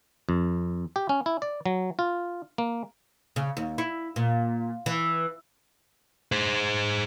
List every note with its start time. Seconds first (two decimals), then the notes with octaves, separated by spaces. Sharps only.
0.29 F2
0.96 G4
1.09 C#4
1.26 E4
1.42 D5
1.66 F#3
1.99 F4
2.58 A#3
3.36 C#3
3.57 D#2
3.78 E4
4.16 A#2
4.86 E3
6.32 G#4 C5